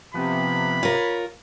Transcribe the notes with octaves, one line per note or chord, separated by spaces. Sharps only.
C3 F3 B3 C4 B5
F4 A#4 C#5